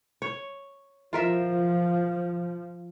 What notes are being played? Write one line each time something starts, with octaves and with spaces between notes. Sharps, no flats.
C#5
F3 F4 A#4 E5